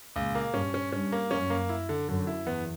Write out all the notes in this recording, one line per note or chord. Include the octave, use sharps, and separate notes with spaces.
C#2 A#2
A#3
G2 C#4
C#4
G2 C#4
A#3
F#2 C#4
A#3
E4
D3
F#2 D3
E4
E2 B3